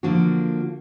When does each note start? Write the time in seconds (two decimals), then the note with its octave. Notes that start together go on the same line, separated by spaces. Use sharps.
0.03 D3 F3 A#3 D4 F#4